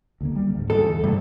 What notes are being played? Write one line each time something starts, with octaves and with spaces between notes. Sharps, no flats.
D2 D3 A#3
G3
D2 G#2
E2 A4
G2 C3 A3 A#3